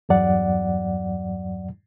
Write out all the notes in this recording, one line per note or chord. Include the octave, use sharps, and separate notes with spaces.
E2 G2 F#3 D5 F#5